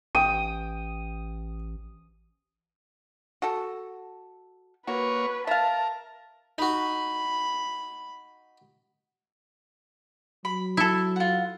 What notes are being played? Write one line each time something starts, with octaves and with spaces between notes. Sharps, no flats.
A1 G5 D#6
F#4 A4
A#3 F#4 B4 C#5
A#4 E5 F5 A5
D#4 F#4 B5
F#3 B5
E4 A4
F4 F#5